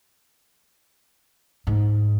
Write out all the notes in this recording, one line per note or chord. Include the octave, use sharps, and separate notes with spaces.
G#2